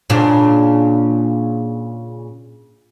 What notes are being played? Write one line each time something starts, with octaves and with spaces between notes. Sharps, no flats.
A#2 C#3 D4